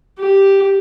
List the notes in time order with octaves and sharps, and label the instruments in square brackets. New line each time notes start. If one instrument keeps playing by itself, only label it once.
[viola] G4